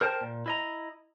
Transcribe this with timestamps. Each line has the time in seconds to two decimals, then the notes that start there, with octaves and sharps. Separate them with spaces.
0.01 A#4 C5 G5 A5
0.21 A#2
0.46 E4 D#5 A#5